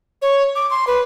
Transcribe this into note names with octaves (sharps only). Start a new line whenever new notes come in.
C#5
D6
C6
B4